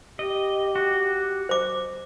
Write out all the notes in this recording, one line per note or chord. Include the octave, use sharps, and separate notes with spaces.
G4 D#5
F#4
C5 D6